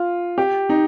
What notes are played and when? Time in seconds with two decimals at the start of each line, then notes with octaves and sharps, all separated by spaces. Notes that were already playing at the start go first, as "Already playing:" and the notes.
Already playing: F4
0.38 G4
0.69 D#4